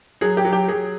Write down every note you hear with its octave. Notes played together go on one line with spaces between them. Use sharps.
F#3 G#4
G4
F#3
G4
F#3 G#4